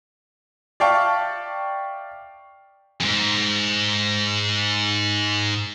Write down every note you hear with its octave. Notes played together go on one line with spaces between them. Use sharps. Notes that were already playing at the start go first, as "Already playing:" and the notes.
D5 E5 F5 G5 A5 C#6
F2 G#2